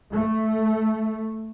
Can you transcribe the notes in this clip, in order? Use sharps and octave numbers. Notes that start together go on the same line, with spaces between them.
A3